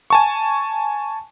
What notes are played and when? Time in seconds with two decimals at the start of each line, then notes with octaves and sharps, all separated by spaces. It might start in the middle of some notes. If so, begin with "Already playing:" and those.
0.10 G#5 A5 C#6